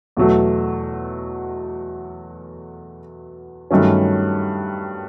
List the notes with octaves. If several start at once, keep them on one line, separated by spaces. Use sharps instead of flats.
E2 B2 F#3 A3
G2 D#3 F#3 A3 C#4